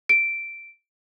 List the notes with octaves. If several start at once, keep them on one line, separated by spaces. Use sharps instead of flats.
D7